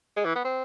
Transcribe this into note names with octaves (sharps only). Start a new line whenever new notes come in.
G#3
E3
B3
C4